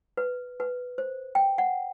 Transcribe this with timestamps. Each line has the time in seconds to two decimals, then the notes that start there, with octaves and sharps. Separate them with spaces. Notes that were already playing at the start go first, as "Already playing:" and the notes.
0.17 B4
0.60 B4
0.98 C5
1.35 G5
1.58 F#5